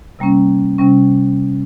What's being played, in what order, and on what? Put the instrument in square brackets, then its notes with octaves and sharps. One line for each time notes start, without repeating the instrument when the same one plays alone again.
[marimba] C3 G3 A#3 C#4
C3 G3 C#4